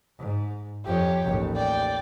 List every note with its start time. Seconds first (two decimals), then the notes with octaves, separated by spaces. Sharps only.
0.18 G#2
0.85 F2 F3 G4 C#5
1.23 A1 D#2
1.56 D5 G5